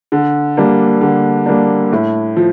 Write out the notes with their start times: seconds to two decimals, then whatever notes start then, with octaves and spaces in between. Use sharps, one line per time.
0.12 D3
0.57 G3 A#3 D4
1.01 D3
1.46 G3 A#3 D4
1.92 A2
2.36 F3